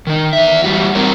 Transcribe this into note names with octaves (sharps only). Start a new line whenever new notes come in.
D#3 D#4
E2 E5
E3 G3 F#4
F#3 G3 C4 A#4 C#5